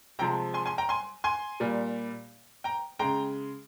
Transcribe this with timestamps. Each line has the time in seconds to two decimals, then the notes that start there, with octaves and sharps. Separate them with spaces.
0.19 C3 F3 G#3 G5 A#5
0.54 G#5 C6
0.66 G#5 C6
0.78 G5 A#5
0.89 G#5 C6
1.24 G#5 C6
1.60 A#2 G3
2.64 G5 A#5
2.99 C#3 G#3 G5 A#5